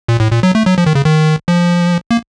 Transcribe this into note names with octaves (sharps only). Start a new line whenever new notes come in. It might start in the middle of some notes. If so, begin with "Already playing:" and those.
A#2
A2
A#2
F#3
A3
F#3
F3
D#3
C#3
D#3
F3
A#3